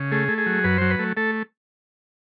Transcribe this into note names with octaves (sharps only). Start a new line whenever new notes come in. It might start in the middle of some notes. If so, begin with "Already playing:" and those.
Already playing: C#3
A3 G#4
A3
G#4
F#3
F#2 B4
F#3 C5
B4
A3
A3 A4